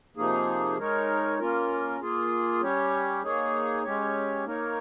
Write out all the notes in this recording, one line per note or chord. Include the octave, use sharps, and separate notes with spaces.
C3 F3 A#3 D#4 G#4
G#3 D#4 A#4 C#5
A#3 C#4 F4 A#4
A#3 F4 G#4
G3 C#4 G4 C#5
A#3 D#4 G#4 C#5
G#3 C#4 G4 C#5
A#3 D#4 A#4 C#5